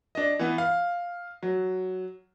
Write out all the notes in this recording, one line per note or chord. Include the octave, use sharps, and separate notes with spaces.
D4 D#5
E3 B3
F5
F#3